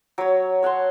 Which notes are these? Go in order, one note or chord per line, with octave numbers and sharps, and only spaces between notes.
F#3 C#5
C#5 F#5 A5 C6